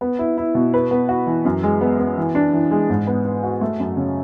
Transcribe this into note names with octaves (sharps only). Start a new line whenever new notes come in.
B3
E4
E4
B2
B4
B3
F#4
E3
F#2
G#3
B3
B3
E3
D4
E3
G#3
G#2
B3
B3
F#4
A3
F#2
C#3